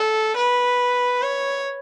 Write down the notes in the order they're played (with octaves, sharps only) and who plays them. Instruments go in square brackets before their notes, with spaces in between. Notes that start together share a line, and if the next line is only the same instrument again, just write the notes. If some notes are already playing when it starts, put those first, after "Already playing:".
Already playing: [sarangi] A4
B4
C#5